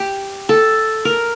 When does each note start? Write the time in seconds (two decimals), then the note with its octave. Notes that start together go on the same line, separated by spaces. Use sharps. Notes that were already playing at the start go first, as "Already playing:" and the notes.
Already playing: G4
0.49 A4
1.05 A#4